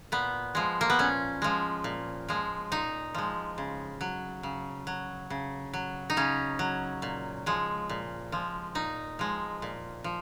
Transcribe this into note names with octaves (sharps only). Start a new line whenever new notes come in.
A#2 B3
F3 G#3
A#3
B3
A#2 C#4
F3 G#3
A#2
F3 G#3
A#2 D#4
F3 G#3
C#3
F#3
C#3
F#3
C#3
F#3
D#4
C#3 C#4
F#3
A#2
F3 G#3
A#2
F3 G#3
A#2 D#4
F3 G#3
A#2
F3